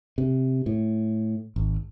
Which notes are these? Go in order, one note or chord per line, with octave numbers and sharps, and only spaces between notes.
C3
A2
G#1